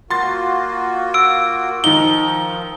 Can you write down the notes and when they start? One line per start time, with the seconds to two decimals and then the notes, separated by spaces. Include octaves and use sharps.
0.10 A#3 F4 F#4 C6 A6
1.14 E6 D7
1.84 D#3 F3 D#4 G7